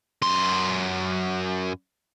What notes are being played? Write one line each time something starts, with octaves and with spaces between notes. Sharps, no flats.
F#2 C6